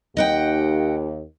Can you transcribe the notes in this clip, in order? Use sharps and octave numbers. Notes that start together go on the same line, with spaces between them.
D#2 D#5 F#5 G5